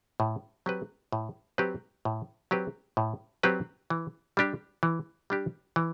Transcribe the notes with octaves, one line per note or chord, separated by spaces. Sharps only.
A2
F#3 C4 G4 B4
A2
F#3 C4 G4 B4
A2
F#3 C4 G4 B4
A2
F#3 C4 G4 B4
E3
G3 D4 G4
E3
G3 D4 G4
E3